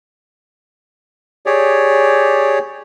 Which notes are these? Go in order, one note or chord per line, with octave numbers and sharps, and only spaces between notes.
G4 G#4 C#5 D5